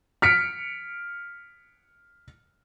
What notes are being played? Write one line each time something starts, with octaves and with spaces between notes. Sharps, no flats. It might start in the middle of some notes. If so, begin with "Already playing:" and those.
F6 B6 C#7 D7